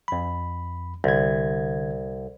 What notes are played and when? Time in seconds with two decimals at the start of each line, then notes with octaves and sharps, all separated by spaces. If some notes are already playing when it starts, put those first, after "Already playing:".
0.08 F2 B5
1.04 C2 D3 G#6